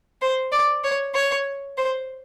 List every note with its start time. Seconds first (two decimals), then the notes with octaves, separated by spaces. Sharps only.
0.22 C5
0.52 D5
0.84 C#5
1.15 C#5
1.77 C5